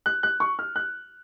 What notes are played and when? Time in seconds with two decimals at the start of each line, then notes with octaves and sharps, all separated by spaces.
0.06 F#6
0.23 F#6
0.40 C#6
0.59 F6
0.76 F#6